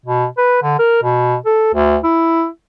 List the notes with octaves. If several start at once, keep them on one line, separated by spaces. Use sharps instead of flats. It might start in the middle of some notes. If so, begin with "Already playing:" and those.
B2
B4
D3
A#4
B2
A4
D2
E4